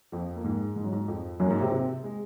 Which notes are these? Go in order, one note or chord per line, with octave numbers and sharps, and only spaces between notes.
F2 F3
A#3
G#2 G#3
G#2 G#3
F#3
G#2 G#3
F2 F3
F#2 F#3
A#3
G#2 G#3
C3 C4
C3 C4
G#3